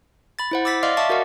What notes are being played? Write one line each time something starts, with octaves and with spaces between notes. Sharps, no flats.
B5 A6
E4 C5 F#5
D6 E6 A6 B6
D5 D#5 F5 C6 D6 F6
E5 F5 A5 C#6 D6 A6
F#4 A#4 D#5 F5 F#5